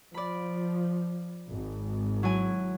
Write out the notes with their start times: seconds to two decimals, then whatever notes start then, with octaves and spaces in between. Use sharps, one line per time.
0.14 F3 D5 B5
1.50 G#1
2.23 F#3 E4 G#5